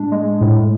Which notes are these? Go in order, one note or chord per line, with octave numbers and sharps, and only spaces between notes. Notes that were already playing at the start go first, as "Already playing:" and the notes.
Already playing: A2 G#3 D4
G#3
A2